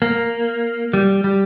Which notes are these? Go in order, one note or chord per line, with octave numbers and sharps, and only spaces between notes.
A#3
G3
G3